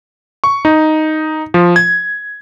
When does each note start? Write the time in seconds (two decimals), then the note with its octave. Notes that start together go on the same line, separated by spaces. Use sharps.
0.44 C#6
0.65 D#4
1.54 F3
1.76 G#6